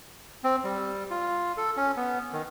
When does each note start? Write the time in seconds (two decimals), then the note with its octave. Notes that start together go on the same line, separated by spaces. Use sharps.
0.44 C4
0.64 G3
1.11 F4
1.57 A4
1.77 C#4
1.96 B3
2.33 D#3